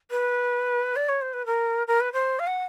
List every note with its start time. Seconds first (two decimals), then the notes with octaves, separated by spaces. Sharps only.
0.10 B4
0.96 D5
1.08 C#5
1.21 C5
1.33 B4
1.46 A#4
1.87 A#4
2.00 B4
2.12 C5
2.39 F5
2.46 F#5